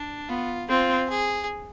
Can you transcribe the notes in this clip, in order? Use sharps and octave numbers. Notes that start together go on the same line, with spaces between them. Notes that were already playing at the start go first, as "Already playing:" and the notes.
Already playing: D4
B3 F4
C4 F4
G#4